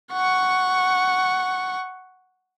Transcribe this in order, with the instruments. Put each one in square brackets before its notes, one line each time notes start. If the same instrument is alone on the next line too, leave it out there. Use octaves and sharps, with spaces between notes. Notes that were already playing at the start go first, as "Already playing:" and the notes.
[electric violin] F#5 C#6